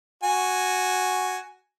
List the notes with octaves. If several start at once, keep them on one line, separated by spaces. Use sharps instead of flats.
F#4 G#5